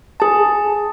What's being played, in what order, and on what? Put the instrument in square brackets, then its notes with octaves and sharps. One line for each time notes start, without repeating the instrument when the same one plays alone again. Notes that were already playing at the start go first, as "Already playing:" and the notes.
[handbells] G#4 A5